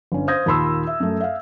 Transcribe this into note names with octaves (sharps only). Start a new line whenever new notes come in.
G1 C#4
C5 F5 D#6 G6 G#6 A#6
D#2 A#2 A5 B5 C6 E6
E5
F#2 A3
E5 F5